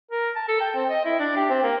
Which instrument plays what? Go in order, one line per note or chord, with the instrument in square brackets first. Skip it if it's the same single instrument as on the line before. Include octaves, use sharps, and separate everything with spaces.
[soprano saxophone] A#4
A5
A4
G5
C4
D#5
E4
D4
G4
C4
A#3